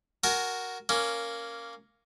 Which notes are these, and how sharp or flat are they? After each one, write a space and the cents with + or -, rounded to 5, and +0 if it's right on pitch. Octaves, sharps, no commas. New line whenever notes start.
F#4 +0 A#4 +0 G#5 +30
A#3 +0 C#4 +0